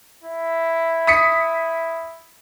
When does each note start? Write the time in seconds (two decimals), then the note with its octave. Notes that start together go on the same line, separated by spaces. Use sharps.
0.23 E4
1.07 D#6 B6 C#7